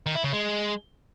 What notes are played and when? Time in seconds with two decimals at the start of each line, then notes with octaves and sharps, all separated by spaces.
0.06 D#3
0.15 E4
0.24 C#3
0.33 G#3